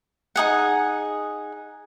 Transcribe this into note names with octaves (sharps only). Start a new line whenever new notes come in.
D#4 G#4 F#5